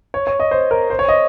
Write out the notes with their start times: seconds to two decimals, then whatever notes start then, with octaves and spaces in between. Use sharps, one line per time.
0.14 C#5
0.27 C#5
0.40 D#5
0.51 C5
0.71 A#4
0.90 C5
0.99 C#5
1.09 D#5